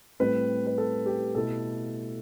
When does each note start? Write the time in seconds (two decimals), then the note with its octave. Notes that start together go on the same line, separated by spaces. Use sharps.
0.20 A2 G3 C4 E4 B4
0.66 B4
0.78 A4
1.06 G4
1.35 B2 A3 E4 A4